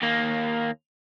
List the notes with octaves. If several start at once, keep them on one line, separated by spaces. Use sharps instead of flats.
D#2 A#3